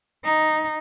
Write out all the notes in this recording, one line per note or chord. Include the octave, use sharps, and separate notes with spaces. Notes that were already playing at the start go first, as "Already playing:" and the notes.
D#4